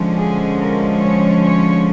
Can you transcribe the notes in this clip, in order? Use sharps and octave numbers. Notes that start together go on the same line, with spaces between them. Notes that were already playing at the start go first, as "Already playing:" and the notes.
Already playing: D3 F3 G#3 C#4
G#4
A#4
C#5
C#5